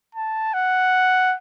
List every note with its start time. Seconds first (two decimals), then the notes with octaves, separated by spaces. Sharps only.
0.15 A5
0.54 F#5